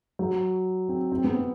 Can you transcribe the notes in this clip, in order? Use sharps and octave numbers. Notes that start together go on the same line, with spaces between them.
F#3
C4
C4
B3
C4